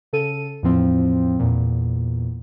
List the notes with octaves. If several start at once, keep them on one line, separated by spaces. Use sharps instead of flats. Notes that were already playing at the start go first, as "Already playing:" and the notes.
C#3 A4 D#7
E2 A2 F3 C4
E2 A#2